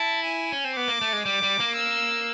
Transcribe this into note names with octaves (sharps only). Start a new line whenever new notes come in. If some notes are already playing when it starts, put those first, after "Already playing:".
Already playing: E4 A5
G#5
C#4
C4
B3 D6
A#3
A3
G#3
G3 D6
G3
A#3
E6